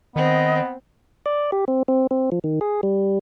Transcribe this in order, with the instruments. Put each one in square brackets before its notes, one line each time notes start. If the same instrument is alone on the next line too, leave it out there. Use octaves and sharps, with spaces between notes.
[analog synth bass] D#3 [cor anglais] B3 [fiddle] C4 [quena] D#5
[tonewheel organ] D5
G4
C4
C4
C4
F3
D#3
G#4
G3